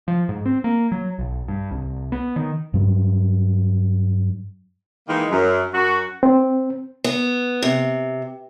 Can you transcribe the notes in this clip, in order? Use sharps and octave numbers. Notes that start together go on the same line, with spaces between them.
F3
G#2
C4
A#3
F#3
B1
G2
C2
B3
D#3
G2 F#3
D#3 E3 G#3 A#3 D#4
F#2
F#2 F#4
C4
B3
C3